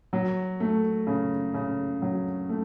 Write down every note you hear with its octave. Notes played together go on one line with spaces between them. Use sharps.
F#3
A3
C#3
C#3
F#3
A3